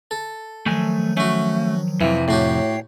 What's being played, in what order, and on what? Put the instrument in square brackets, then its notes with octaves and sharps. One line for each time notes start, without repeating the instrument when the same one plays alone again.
[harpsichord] A4
[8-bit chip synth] D#3 F3 F#3 [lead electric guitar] A3 G#5
[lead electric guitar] A3 [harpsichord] C#4 F#4
[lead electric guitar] F2 C3 [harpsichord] E3 [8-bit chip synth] F#3
[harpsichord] A2 F#4 G4 [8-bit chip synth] C#5 G5 C7